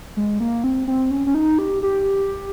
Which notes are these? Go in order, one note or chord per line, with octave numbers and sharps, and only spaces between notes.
G#3
A#3
C4
C4
C#4
C#4
D#4
G4
G4